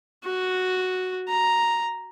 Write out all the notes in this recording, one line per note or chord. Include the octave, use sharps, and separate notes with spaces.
F#4
A#5